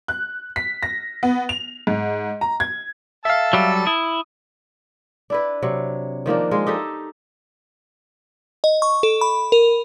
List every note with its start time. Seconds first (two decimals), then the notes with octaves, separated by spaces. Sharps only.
0.08 F#6
0.56 B6
0.83 A#6
1.23 B3
1.49 F7
1.87 G#2
2.41 A#5
2.60 G#6
3.25 E5 F5 A5 E6
3.53 F#3 G3
3.87 E4 D#6
5.30 D4 E4 B4
5.62 C3 F#3
6.26 D#3 F3 A#3 D4
6.51 G#3 F4
6.67 D#4 G4 A4 E5
8.64 D#5
8.82 C#6
9.03 A4
9.21 B5
9.52 A#4